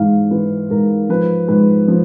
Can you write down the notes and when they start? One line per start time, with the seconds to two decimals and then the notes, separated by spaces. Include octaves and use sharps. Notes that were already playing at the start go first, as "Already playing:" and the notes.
Already playing: G#2 E3 F5
0.31 E3 B4
0.70 G#2 A#4
1.09 F3 B4
1.48 G#2 B4
1.88 F3